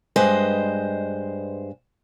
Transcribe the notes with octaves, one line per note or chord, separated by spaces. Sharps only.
G2 G#3 B4 C5 D#5